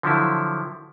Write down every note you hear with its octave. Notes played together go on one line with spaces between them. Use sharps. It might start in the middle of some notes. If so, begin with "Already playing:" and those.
D3 F3 F#3 E4